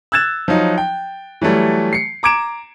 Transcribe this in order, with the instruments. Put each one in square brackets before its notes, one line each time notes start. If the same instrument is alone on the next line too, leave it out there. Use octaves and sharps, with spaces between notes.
[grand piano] E6 F#6 G#6 A6 E7
F3 F#3 D#4
G5
E3 F#3 G3 A3
C7 C#7
A#5 D6 G#6 D7 E7